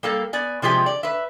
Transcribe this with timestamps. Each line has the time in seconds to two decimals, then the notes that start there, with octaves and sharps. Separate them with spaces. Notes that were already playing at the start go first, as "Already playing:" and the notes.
0.03 G3 A#3 A4
0.33 B3 D5 G#5
0.62 C3 F3 G#3 G4
0.86 D5
1.03 B4 E5